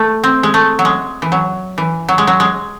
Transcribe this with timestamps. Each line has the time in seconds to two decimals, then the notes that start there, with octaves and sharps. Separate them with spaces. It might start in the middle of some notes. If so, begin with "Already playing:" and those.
Already playing: A3
0.24 C4
0.43 G#3
0.54 A3
0.79 F#3
0.85 G#3
1.22 E3
1.32 F#3
1.78 E3
2.09 F#3
2.18 G#3
2.27 F#3
2.40 G#3